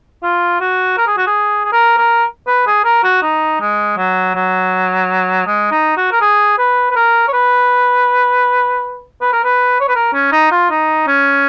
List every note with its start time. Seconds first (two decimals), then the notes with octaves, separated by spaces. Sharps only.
0.23 F4
0.60 F#4
0.97 A#4
1.07 G#4
1.17 F#4
1.27 G#4
1.65 G#4
1.72 A#4
1.98 A#4
2.47 B4
2.66 G#4
2.85 A#4
3.04 F#4
3.22 D#4
3.60 G#3
3.97 F#3
4.35 F#3
5.46 G#3
5.71 D#4
5.97 F#4
6.11 A#4
6.21 G#4
6.58 B4
6.90 B4
6.96 A#4
7.28 C#5
7.33 B4
9.21 B4
9.32 A#4
9.44 B4
9.80 C#5
9.88 B4
9.95 A#4
10.13 C#4
10.32 D#4
10.51 F4
10.70 D#4
11.07 C#4